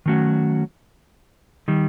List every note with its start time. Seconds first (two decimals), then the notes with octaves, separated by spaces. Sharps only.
0.06 D#3 F#3 A3 C#4 F#4
1.68 D#3 G3